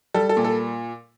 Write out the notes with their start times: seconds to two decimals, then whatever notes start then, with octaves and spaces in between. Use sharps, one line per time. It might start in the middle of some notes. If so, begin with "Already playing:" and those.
0.14 G3 A4
0.29 A4
0.37 A#2
0.44 A4